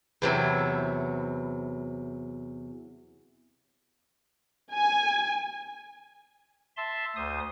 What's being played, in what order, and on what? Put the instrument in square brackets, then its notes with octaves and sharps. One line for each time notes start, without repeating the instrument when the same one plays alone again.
[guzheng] E2 C3 F#3 E4
[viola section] G#5
[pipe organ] E5 A5 C6
D2 C5 D#6